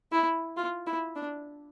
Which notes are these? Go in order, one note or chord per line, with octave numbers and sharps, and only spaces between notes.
E4
F4
E4
D4